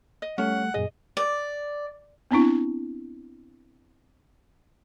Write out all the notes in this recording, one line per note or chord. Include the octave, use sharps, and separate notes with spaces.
D#5
G3 A3 C#4 F#5
F#2 A#2 G#4 D#5
D5
B3 C4 D4 E4